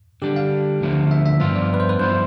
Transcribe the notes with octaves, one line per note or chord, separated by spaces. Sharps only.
D3 G3 D4 G4
F5
D2 D3 F3 A3
E5
E5
G2 F3 B3 D4 F4 E5
D5
B4
C5
B4
G2 F3 B3 E4 C5